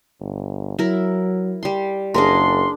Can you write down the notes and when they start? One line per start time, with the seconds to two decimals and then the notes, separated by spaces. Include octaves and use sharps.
0.20 G1
0.79 F#3 E4 A#4
1.63 G3 C6
2.14 F#1 D4 G#4 A#4 C6